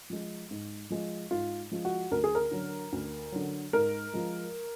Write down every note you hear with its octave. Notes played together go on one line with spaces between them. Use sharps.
F3 G#3
G#2
F3 G#3
G#2 F4
F3 G#3
F#4
D2 A#4
G#4
A#4
D3 F#3
D2
D3 F#3
G#2 A#4
F3 G#3